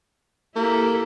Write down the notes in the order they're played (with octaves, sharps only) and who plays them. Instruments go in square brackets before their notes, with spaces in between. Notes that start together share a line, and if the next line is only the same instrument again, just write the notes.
[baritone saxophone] A#3 [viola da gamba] E4 G4 A4